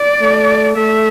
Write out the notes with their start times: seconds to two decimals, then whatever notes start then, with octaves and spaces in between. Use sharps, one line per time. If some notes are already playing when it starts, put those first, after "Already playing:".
Already playing: D5
0.21 A3
0.77 A3 E5